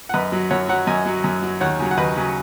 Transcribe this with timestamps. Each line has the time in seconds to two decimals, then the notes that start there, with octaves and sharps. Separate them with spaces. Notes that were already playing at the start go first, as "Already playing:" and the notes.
0.09 F#5
0.14 F#2 B4 D#5
0.32 F#3
0.51 F#2 C#5 F#5
0.69 F#3 C#5 F#5
0.87 F#2 D#5 G#5
1.06 F#3
1.24 F#2
1.43 F#3
1.61 D#2 C#5 F#5
1.79 C#3 F#3
1.91 F#5
1.97 D#2 B4 D#5
2.16 C#3 F#3